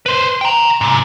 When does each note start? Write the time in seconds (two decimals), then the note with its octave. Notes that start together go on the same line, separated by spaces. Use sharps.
0.06 B4 C5
0.41 G5 A#5
0.81 G#2 C3